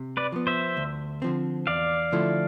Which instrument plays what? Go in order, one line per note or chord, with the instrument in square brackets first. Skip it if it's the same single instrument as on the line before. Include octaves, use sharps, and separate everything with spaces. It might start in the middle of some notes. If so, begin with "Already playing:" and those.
Already playing: [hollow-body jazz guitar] C3
[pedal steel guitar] B4 D5
[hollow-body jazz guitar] F3 B3
[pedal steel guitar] C5 E5
[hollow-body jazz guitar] D2
D3 F3 C4
[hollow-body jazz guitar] E2 [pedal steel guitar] D5 F5
[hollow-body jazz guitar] D3 F3 A3 E4